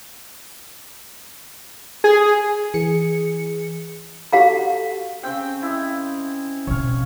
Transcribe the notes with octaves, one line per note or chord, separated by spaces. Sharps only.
G#4
E3 G#4 C#7
F#4 G4 A4 F5 A#5
C#3 C4 G5
E4 D#5
B2 C4 C#5 F5